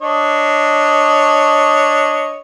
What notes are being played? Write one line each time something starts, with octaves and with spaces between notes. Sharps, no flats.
D4 C#5 D#5